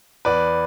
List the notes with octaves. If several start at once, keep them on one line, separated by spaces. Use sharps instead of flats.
E2 B4 D5